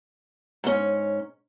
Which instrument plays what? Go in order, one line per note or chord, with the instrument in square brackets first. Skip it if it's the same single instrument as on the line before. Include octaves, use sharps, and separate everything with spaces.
[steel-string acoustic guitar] G#2 C#4